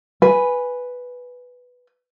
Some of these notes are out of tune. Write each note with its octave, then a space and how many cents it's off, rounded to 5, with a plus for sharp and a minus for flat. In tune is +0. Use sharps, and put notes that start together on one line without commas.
B4 +0 G#5 +0